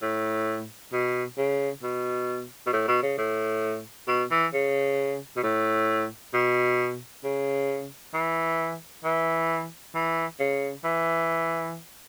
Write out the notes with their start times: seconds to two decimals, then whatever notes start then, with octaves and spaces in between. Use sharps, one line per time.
0.02 A2
0.92 B2
1.38 C#3
1.83 B2
2.66 B2
2.73 A2
2.88 B2
3.02 C#3
3.18 A2
4.08 B2
4.31 E3
4.53 C#3
5.36 B2
5.43 A2
6.34 B2
7.24 C#3
8.14 E3
9.04 E3
9.94 E3
10.39 C#3
10.84 E3